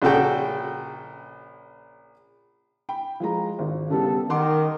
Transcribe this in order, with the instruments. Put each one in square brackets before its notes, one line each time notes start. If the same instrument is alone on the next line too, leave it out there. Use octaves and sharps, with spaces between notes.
[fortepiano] A#1 C#3 F#4 A4 G5
[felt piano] G5 B5
F3 G#3 A#5
G#1
[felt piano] C#3 G3 B3 [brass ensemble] A4
[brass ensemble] D#3 [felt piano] F#5 C6 D6